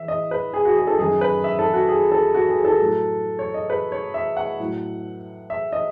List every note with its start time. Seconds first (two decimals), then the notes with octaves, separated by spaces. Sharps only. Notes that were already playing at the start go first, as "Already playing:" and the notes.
Already playing: E3 E5
0.08 D#5
0.31 B4
0.54 G#4
0.65 F#4
0.77 G#4
0.87 A4
0.99 F#2 D#3 F#3 G#4
1.21 B4
1.44 E5
1.59 A4
1.74 F#4
1.89 G#4
2.12 A4
2.34 F#4
2.49 G#4
2.65 A4
2.79 A2 F#3
3.39 C#5
3.54 D#5
3.70 B4
3.92 C#5
4.14 E5
4.37 F#5
4.60 A2 F#3
5.50 E5
5.72 D#5